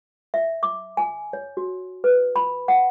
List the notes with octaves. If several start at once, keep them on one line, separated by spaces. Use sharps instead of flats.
E5
D6
G#5
C#5
F#4
B4
B5
F#5